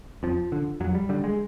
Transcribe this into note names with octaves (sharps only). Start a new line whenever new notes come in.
F2 F3
D3
F2 F#3
G3
D3 G3
G#3